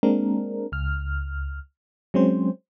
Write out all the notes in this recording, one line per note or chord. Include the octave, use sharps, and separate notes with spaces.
G#3 A#3 C4 D4 A#4
C#2 F6
F#3 G#3 C4 C#4 C5